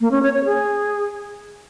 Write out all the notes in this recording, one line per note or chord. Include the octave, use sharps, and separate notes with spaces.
A#3
C#4
C#5
C#5
G#4